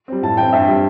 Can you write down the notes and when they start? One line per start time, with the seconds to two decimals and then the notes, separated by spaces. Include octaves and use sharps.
0.08 G3 C4
0.23 A2 A5
0.37 E3 C4 G5
0.53 G2 E5
0.68 G3 C4